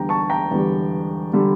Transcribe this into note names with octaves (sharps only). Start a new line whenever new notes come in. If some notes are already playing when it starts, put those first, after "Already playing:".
Already playing: E2 D3 G3 G5 A#5
A5 C#6
G5 A#5
E2 D3 G3
D3 G3